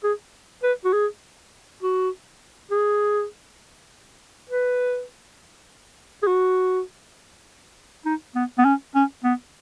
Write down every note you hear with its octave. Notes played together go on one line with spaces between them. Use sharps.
G#4
B4
F#4
G#4
F#4
G#4
B4
G#4
F#4
D#4
B3
B3
C#4
C#4
B3